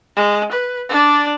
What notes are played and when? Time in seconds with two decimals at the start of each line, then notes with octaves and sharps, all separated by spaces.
0.16 G#3
0.52 B4
0.89 D4 D5